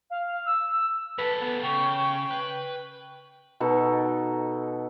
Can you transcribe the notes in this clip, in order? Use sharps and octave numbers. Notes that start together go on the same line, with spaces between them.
F5
E6
E6
E2 A4 B4
B3
C#3 G5 C#6
B4
B2 D#4 A4